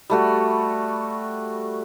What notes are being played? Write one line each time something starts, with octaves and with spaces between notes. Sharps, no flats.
G3 A3 F#4